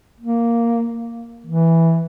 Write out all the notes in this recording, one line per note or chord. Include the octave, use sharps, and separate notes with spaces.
A#3
E3